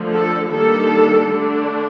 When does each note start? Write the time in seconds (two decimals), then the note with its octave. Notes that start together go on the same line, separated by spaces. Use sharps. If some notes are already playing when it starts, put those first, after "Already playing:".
Already playing: D3 F3 A3
0.12 A4
0.50 D#3 G3 A#3 D4 A4
1.28 D3 A3 D4